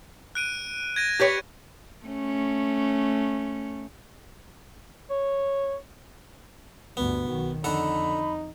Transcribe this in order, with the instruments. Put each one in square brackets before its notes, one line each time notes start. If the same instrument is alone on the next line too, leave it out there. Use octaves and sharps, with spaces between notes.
[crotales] F#6 D7 D#7
G#6 A#6 D#7
[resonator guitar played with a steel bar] G4 B4 C#5
[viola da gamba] A3 C#4
[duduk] C#5
[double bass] D2 G2 [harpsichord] B3
[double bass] B1 D#3 [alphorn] F#4
[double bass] F2 [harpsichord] D3 A4 F#5 [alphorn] D#4 [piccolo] B5